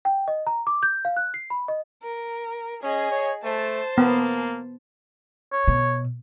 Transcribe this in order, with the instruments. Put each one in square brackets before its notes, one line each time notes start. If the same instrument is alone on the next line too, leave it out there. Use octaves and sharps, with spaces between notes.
[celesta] G5
D#5
A#5
D6
G6
F5
F#6
C7
B5
D#5
[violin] A#4
[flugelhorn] C#4 [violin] G#4 D#5
[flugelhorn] C#5
[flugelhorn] A3 [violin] C5 A5
[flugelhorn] A#3 [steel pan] B3
[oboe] C#5
[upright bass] B2